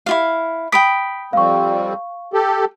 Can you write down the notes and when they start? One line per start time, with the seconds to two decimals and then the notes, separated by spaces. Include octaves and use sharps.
0.06 E4 F4 F5
0.72 G5 B5 D#6 B6 D7
1.33 F2 G3 C4 F5 C#6
2.33 G4 A4